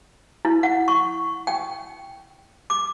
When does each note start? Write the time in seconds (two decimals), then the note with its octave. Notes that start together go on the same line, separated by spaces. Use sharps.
0.45 E4
0.63 F#5
0.88 C#6
1.47 G5
2.70 D6